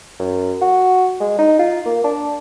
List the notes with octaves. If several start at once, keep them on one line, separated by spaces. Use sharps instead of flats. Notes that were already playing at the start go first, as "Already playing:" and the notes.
F#2
F#4
G#3
D#4
F4
A#3
D4